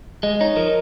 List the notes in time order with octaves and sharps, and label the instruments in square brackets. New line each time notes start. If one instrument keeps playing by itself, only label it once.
[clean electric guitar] G#3 [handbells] D#5
[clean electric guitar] D#4 [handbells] C#5
[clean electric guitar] F3 [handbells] A#4